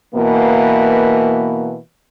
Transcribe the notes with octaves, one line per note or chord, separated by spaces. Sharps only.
B2 E3 A#3